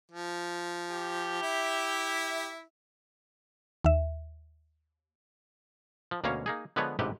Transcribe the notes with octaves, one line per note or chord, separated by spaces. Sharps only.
F3
G4
E4 E5
D#2 E5
F3
D2 B2 A#3 C#4 C#5 F5
A#3 D#4 G#4
D3 F3 G#3 B3 B4 C#5
A1 G#2 C3 G4 B4